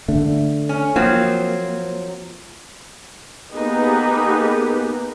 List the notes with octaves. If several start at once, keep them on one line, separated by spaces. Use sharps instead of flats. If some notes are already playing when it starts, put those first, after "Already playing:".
D3 A3
C#4
F3 F#3 A#3 C4
A#3 B3 D#4 G4 G#4 B4